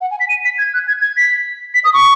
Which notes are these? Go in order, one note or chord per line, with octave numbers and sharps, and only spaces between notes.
F#5
G#5
B6
D#7
B6
G#6
F#6
G#6
G#6
B6
B6
D#6
C#6